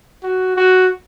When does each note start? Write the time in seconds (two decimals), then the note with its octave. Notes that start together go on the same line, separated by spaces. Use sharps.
0.23 F#4
0.57 F#4